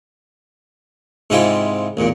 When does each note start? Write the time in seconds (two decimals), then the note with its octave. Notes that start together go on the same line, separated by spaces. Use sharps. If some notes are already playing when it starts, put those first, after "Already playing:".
1.30 G#2 C3 G#3 E4 F4 G4
1.97 A1 E2 A#2